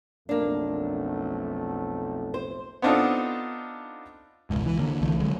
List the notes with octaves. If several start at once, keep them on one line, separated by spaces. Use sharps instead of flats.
B1 F2 A3 A#3 D4
C5
B3 C4 D4 D#4 F4 A4
E1 C#2 G#2
E3
D3 A#3
C2 D3 E3 A3
D3 F#3 G#3